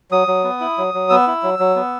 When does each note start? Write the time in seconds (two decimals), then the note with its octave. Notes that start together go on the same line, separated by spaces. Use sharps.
0.11 F#3 D#6
0.27 F#3
0.44 B3
0.60 E4
0.78 F#3
0.94 F#3
1.10 B3 E6
1.27 E4
1.43 F#3
1.59 F#3
1.76 B3